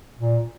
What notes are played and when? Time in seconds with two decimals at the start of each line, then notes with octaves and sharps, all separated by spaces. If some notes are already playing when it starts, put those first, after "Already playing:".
0.19 A#2